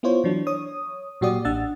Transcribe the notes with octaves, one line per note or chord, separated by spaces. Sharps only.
B3 E4 F4 C5 C#5
E3 F#3 D4
C#5 D#6
A#2 F#3 F#4 G4 D5 D#6
A1 D4 F#5 E6 A6